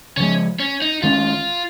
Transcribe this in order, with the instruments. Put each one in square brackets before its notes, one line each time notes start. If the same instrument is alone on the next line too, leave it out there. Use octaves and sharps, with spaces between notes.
[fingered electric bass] C#3 F3 G#3 [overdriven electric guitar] C#4
[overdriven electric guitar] C#4
D#4
[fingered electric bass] D#3 G#3 C#4 [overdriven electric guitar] F4